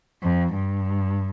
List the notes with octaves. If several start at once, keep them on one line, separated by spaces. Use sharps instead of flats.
F2
G2